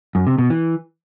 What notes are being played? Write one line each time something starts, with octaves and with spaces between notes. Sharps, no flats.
F#2
C3
B2
E3